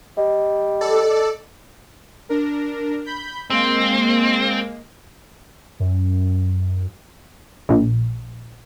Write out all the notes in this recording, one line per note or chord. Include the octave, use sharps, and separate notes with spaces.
G3 D#5
A4 D5
D4 A#4
B5 G6
G#3 A#3 C4
F#2
A#1